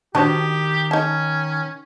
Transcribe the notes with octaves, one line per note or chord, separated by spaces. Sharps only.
D#3 D4 F#4 G4 C5
C#4 D#4 A5